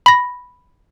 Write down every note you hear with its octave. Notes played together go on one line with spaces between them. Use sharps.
B5 A#6